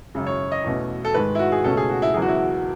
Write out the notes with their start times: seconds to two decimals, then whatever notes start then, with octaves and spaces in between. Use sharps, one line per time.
0.15 G#1 F#2 C#3
0.26 C#5
0.52 D#5
0.64 E2 B2 A3 C#4
1.05 A4
1.14 G#2 D#3 G#3 B4
1.35 E4
1.39 F#4
1.52 G#4
1.64 C#2 B2 A3 C#4 A4
1.77 G#4
1.89 F#4
2.02 E4
2.14 E1 E2 C#3 F#3 G#4
2.22 F#4
2.28 E4
2.36 F#4